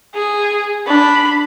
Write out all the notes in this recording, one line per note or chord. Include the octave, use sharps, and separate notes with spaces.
G#4
D4 B5